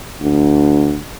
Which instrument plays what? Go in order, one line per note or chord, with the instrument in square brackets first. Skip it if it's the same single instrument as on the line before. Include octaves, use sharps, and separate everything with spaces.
[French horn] D2